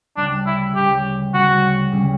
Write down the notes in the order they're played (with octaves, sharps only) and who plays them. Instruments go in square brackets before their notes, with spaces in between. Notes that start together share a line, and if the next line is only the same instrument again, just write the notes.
[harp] D2 C#3 G3 C#4 [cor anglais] D4
[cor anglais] E4
[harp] D2 C#3 G3 C#4 [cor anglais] G4
[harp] D2 C#3 G3 C#4 [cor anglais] F#4
[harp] D2 C#3 G3 C#4